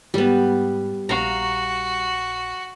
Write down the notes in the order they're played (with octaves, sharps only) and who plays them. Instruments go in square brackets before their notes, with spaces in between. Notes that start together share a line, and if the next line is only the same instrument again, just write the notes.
[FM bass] G#2 [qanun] G3 B3
[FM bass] A#1 [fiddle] F#4 [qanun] F5 A#5